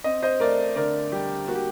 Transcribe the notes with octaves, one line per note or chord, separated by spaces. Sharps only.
C4 D#5
C5 D#5
A3 A#4 D5
D3 A#4 D5
G3 G4
A#3 F#4
G4